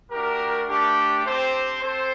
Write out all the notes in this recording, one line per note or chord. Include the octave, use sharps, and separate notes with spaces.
A3 D4 F#4 G4 A#4
A3 D4 G4
C4 G4 A4 C5
C4 A4 C5